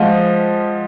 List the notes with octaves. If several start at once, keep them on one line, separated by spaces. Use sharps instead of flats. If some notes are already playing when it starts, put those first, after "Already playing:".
Already playing: F3 G#3 D#5 F5 F#5